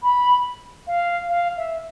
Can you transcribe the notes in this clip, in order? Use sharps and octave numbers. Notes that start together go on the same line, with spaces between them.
B5
F5
F5
E5